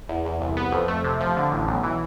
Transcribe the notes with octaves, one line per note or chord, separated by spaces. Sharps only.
E2
E2
C2
B3
F2
A3
C3
F3
D3
A1
B1
E3